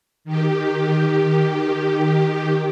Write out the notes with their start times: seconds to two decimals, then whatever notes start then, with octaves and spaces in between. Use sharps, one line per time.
0.25 D#3 G4